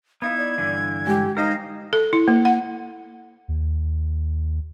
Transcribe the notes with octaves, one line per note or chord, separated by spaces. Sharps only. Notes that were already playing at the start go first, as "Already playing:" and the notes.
B3 D#4 E4 F5 G#6
D5
G2 D3 E3
G#3 G4
D#4 A#4 C5 D#5 F5
A4
E4
A#3
F#5
D#2